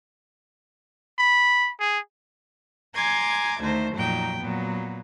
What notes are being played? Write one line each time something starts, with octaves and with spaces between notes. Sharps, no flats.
B5
G#4
G#5 A#5 C6 D6 G#6
D2 D#3 A3 C5
F2 A#2 F#3 D#4 G5
A#2 F#3 B3